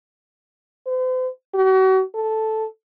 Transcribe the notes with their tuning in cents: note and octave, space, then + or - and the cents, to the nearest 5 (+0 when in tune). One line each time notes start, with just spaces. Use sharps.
C5 -40
F#4 +40
A4 -5